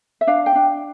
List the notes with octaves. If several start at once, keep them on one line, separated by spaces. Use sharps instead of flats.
E5
D4 F5
G5
D4